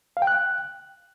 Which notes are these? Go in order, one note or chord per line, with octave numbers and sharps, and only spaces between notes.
F5
G5
F#6